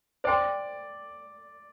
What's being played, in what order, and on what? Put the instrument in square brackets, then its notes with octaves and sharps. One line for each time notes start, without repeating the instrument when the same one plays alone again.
[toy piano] C5 G5 C6 [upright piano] D5